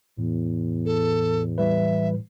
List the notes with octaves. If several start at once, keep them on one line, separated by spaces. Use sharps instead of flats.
E2 A2
A4
E3 G3 B4 E5